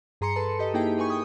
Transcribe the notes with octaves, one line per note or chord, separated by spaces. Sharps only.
G2 G#4 A#5 C6 C#7
A4 B4 A5
G4 A4 D#5
A#3 D#4 E4 G4 G#4 G5
D#4 B4 G#5 C#6
G5 D#6